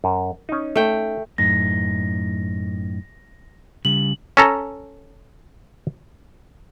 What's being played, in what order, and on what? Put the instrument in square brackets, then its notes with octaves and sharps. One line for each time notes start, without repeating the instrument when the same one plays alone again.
[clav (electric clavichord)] F#2
C#4 D#4
[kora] A3 G5
[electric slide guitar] F#2 A2 D#4 [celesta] A#6
[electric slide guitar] C#3 G3 [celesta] F#7
[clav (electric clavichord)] C#4 A4 A#5